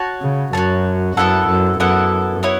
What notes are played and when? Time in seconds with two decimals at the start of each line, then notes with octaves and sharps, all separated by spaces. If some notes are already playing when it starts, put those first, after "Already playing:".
Already playing: F#4 C#5 A5
0.21 C#3
0.53 F#2 F#4 C#5 A5
1.17 F#2 B3 E4 A4 F#5
1.48 F#2
1.80 F#2 B3 E4 A4 F#5
2.43 B3 E4 C#5